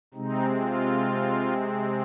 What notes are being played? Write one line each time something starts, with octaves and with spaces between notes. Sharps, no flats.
C3 G#3 C4 D#4
F4